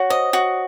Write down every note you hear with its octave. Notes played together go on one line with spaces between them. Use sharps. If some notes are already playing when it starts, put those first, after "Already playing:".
Already playing: F#4 C#5
C5 D#5
F#4